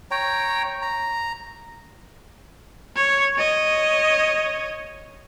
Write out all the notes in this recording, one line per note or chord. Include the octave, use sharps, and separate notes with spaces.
C#5 G5 A#5
A#5
C#5
C#5 D#5